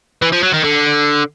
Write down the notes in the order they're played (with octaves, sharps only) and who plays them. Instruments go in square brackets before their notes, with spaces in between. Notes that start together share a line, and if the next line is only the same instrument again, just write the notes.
[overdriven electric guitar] E3
F3
F#3
D#3
D3